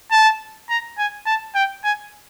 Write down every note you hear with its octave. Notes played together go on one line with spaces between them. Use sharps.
A5
A#5
G#5
A5
G5
G#5